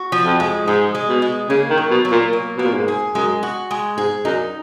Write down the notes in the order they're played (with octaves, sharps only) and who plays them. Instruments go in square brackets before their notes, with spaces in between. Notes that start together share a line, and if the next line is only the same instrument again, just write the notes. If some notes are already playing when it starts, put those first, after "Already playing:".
Already playing: [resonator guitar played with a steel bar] F#4
F3
[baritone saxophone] F2
[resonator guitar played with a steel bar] G#3
[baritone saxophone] G#2 [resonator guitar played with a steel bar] G#3
[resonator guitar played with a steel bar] G#3
[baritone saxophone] B2
[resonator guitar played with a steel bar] G#3
[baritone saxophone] C#3 [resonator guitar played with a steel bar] A#3
[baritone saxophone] D#3
[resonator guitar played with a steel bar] F#3
[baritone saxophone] B2
[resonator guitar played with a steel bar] F#3
[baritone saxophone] A#2
[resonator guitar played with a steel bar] A#3
[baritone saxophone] B2 [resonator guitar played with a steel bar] A#3
[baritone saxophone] A#2
G#2
[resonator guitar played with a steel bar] G#4
[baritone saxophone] F#2 [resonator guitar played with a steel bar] G#3
[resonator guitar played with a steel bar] F#4
G#3
[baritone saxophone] G#2 [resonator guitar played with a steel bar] G#4
[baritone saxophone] F#2 [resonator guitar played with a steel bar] D#4